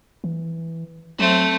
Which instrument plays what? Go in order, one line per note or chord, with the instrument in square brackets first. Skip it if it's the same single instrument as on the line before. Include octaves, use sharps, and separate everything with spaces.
[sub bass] E3
[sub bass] F#3 [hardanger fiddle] A3 C4